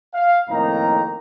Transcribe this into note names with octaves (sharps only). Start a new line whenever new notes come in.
F5
F2 A2 D#3 A#3 D#4 A#5